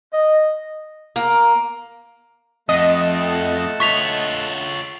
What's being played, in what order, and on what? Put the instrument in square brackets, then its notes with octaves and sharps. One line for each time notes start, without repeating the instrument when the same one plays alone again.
[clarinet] D#5
[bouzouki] A#3
[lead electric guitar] F2 [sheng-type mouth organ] A3 F#5 A5 [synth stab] D#5
[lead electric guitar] F4 C#5 [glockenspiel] C#6 B6 F7